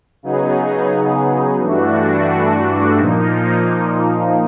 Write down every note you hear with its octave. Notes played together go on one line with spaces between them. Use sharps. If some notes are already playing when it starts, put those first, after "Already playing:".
C#3 F#3 B3 D#4 G#4
G2 E3 A3 D4 F#4
A#2 F3 A#3 D#4